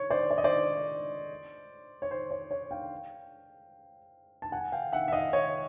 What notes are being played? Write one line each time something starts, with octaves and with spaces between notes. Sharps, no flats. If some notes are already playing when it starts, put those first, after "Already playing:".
Already playing: C#5
C5 D5
D5
D#5
C5 D5
C#5
C5
C#5
C#5
F5 G5
A5
F#5 G#5
F5 G5
E5 F#5
E5
D#5 F5
C#5 D#5